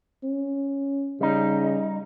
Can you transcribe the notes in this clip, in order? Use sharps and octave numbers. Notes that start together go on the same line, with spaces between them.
C#4
C#3 G3 D#4